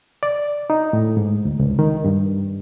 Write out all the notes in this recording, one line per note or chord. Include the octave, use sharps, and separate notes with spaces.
D5
D#4
A2
G#2
D2
C#2
D#3
G2